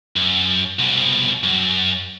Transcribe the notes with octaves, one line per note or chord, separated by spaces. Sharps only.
F#2
C2 B2
F#2